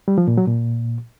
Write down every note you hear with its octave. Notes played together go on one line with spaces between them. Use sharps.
G3
F3
A#2
F#3
A#2